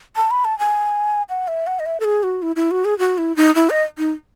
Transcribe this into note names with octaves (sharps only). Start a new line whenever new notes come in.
A5
B5
A5
G#5
F#5
E5
F#5
D#5
E5
A4
G#4
F#4
E4
E4
F#4
G#4
F#4
E4
D#4
E4
D#5
D#4